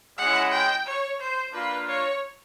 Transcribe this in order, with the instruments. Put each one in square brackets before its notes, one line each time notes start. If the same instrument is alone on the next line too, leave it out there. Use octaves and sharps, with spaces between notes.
[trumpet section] G#3 C#4 E4 [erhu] F#5
[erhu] G5
C#5
C5
[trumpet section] A#3 D4 F4 [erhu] B4
[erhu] C#5